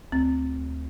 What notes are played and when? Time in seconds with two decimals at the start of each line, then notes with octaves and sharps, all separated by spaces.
0.12 D2 C4